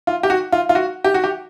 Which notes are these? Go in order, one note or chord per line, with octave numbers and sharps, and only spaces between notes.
F4
G4
F#4
F4
F4
F#4
G4
F#4
G4